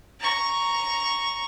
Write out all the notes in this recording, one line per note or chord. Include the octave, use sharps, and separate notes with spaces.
A#5 C#6